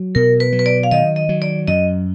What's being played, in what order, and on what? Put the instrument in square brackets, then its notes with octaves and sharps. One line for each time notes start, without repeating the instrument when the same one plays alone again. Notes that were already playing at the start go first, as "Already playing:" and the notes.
Already playing: [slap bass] F#3
[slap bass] B2 [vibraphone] A#4
[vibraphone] B4
[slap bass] F#3
[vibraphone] B4
D5
F5
[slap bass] D#3 [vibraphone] D#5
[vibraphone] D#5
[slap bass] F#3
[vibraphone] D5
[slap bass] F#2 [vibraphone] D#5